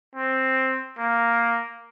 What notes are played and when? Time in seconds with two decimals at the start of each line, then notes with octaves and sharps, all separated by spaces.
0.15 C4
0.98 A#3